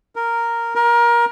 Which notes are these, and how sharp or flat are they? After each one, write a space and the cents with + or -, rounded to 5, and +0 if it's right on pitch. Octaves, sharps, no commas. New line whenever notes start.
A#4 -5
A#4 +25